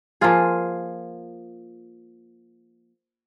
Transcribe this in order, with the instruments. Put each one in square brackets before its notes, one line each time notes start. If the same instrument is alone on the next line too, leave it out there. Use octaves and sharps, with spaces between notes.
[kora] F3 A#3 F4 G#4